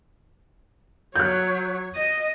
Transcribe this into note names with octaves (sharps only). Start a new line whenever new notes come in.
F#3 C#5 F#6 G6
D#5